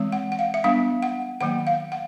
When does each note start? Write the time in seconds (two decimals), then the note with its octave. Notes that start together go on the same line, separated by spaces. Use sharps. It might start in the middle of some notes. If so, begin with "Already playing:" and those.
Already playing: E3 G#3 C4
0.12 F#5
0.32 F#5
0.39 F5
0.54 E5
0.64 G3 B3 D4 F5
1.02 F#5
1.41 D#3 F#3 A#3 F#5
1.67 F5
1.92 F#5